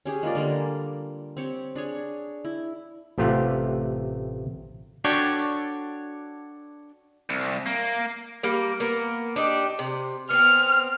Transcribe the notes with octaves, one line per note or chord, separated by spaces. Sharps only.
C#4 G4 G#4
G#3 A#3 F4 D5
D3 G3 A#3
C4 G4 C#5
D4 G#4 C#5
E4
A1 C3 A3 F4 G4 F#5
D4 F#4 A4 C#5 D5 G5
C2
A#3
G3 A#3 A#4
A#3 B3 A#4
D4 D#4 G4
C3
B3 C4 F6